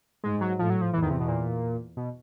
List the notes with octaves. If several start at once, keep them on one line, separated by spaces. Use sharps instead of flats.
G#2 G#3
F#3
A2 F3
F#3
F3
E2 E3
D#3
C3
B2
A#2
B2